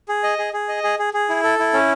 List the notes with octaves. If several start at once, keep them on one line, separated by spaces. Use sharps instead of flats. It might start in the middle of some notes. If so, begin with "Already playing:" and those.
G#4
D#5
G#4
G#4
D#5
G#4
G#4
G#4
E4
A4
E4
C#4